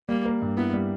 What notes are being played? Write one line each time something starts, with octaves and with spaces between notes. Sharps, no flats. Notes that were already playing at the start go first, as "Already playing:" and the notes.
G3 A#3
A#3
G2
B3 E4
G3